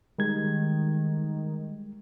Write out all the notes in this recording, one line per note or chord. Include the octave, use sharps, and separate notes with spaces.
D#3 G3 G#3 G#6